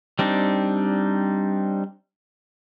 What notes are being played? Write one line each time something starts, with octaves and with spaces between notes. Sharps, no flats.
G3 C4 D4 D#4